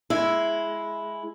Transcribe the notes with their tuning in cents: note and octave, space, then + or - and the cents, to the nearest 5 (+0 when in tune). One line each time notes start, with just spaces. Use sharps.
G#3 +10 E4 +0